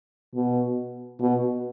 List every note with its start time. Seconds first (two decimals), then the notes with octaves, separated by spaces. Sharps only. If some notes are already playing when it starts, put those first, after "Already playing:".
0.35 B2
1.21 B2